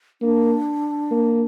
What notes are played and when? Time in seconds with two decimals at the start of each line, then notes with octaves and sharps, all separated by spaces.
0.22 A#3 D4
1.11 A#3